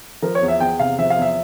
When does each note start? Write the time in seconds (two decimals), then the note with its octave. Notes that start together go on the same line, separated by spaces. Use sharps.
0.22 F3 A#4
0.35 C#5
0.42 E2
0.48 E5
0.60 E2 G5
0.79 C3 F5
0.99 F3 E5
1.10 F5
1.18 E2 E5